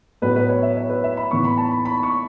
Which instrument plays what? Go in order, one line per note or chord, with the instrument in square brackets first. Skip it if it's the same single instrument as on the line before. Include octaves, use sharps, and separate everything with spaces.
[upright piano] A2 F#3 B3 B4
B4
C#5
E5
C#5
B4
E5
B5
A2 E3 B3 C#6
B5
A5
B5
B5
C#6